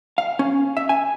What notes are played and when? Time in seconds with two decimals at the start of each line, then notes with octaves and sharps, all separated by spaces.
0.18 F5
0.39 C#4
0.77 E5
0.89 G#5